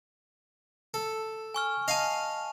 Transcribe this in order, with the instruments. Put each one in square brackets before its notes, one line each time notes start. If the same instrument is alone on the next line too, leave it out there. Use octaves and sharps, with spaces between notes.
[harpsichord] A4
[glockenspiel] G#5 C#6 F6
[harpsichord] D#5 F5 G#5 [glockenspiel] A5 F7